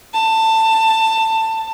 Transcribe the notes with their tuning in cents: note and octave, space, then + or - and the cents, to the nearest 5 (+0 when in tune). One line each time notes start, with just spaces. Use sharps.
A5 +20